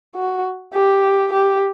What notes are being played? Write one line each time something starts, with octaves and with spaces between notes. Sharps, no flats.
F#4
G4
G4